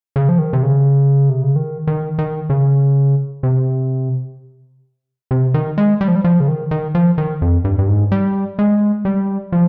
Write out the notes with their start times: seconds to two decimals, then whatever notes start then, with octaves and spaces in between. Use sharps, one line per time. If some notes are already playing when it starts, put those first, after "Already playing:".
0.16 C#3
0.29 F3
0.39 D#3
0.53 C3
0.63 C#3
1.30 C3
1.43 C#3
1.56 D#3
1.87 D#3
2.19 D#3
2.50 C#3
3.43 C3
5.31 C3
5.54 D#3
5.78 G#3
6.01 G3
6.08 F3
6.15 G3
6.24 F3
6.40 C#3
6.48 D#3
6.71 D#3
6.95 F3
7.18 D#3
7.42 F2
7.65 G2
7.79 G2
7.88 G#2
8.12 G3
8.59 G#3
9.05 G3
9.52 F3